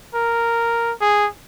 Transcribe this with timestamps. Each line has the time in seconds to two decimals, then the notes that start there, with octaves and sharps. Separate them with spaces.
0.15 A#4
1.01 G#4